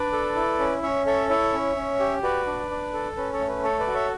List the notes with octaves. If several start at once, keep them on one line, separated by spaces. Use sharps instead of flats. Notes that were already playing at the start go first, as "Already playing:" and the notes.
Already playing: D4 B4 D5
A4
E4
C#4
C#4 C#5 E5
A4 C#5 E5
E4 C#5 E5
C#4
C#4
G4
F#4 B4 D5
D4
D4
A4
C#4 B4
A4 C#5
A3
B4
A4 C#5
B4 D5
F#4
C#5 E5